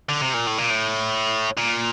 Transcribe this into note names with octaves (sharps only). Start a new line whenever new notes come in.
D3
C3
A#2
A2
A#2
A2
A#2